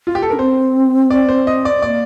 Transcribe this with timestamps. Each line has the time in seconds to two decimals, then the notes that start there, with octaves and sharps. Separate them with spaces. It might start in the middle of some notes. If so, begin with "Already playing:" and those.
0.07 F4
0.15 G4
0.22 A4
0.30 D4 A#4
0.39 C4 C5
1.10 D5
1.29 C5
1.47 D#5
1.65 D5
1.82 A#3 D5